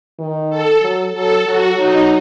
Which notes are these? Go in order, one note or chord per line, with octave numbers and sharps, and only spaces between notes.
D#3
A4
F#3
F#3 A4
F#3 F#4
F#3 D#4